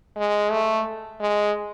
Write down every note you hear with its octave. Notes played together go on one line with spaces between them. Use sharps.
G#3
A3
G#3